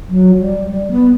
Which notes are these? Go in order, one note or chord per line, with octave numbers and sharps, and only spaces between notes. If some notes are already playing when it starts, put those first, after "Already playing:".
F#3
F#3
G3
G3
B3